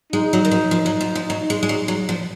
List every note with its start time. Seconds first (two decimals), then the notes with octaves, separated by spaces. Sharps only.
0.13 G#3 D#4
0.33 F#3
0.45 D#3
0.51 F3
0.71 F3
0.86 F#3
1.01 F3
1.15 F3
1.30 F#3
1.50 G#3
1.63 G#3
1.69 F#3
1.88 F#3
2.09 F3